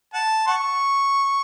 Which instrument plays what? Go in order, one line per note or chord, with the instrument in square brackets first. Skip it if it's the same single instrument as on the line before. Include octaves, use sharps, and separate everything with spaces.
[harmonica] F#5 A5
F#5 A5 C#6